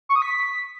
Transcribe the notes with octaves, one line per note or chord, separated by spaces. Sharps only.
C#6
D#6
B6